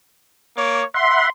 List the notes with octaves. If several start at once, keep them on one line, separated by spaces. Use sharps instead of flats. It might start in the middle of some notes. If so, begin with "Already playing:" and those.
A#3 C#5 D6
E5 F#5 B5 C6